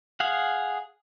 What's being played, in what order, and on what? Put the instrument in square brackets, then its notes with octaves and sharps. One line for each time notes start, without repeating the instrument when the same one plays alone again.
[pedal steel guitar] G#4 F5 F#5